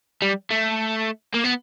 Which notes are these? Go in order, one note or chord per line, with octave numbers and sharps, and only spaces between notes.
G3
A3
A#3
B3